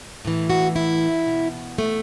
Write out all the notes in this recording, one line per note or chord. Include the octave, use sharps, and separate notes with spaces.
A2 E3
F#4
E4
B2
A3